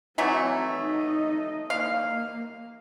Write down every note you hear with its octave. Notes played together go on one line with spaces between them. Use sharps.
E3 F#3 A3 C4
D#4 D#5
A#3 F5